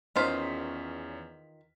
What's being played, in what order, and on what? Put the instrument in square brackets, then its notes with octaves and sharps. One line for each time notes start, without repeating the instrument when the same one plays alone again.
[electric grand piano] E2 C#4 B6 [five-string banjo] D#3 F4 C5